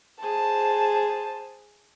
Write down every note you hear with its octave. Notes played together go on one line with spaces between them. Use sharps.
G#4 C5 A5